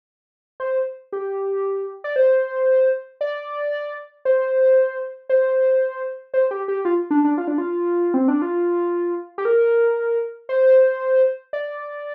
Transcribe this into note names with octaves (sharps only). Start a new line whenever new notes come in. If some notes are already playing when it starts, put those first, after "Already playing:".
C5
G4
D5
C5
D5
C5
C5
C5
G4
G4
F4
D4
D4
F4
D4
F4
C4
D4
F4
G4
A#4
C5
D5